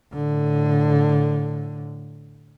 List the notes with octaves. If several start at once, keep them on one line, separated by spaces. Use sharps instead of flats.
A2 D3